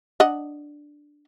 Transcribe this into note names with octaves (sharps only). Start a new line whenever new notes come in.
D4 D#5 F#5